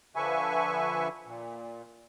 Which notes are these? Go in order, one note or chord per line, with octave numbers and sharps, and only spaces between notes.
D3 F3 B4 E5 G#5 C#6
A#2